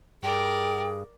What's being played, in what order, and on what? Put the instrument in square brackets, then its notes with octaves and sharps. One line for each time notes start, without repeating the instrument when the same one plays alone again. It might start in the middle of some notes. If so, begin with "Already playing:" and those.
[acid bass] G2 [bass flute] G#4 [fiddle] A#4 D5 [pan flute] G5